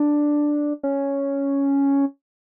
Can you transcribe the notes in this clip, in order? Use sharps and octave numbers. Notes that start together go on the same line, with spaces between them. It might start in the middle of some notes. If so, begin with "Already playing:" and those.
Already playing: D4
C#4